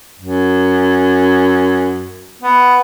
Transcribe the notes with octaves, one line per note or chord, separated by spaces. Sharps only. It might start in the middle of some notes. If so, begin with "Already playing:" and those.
F#2
B3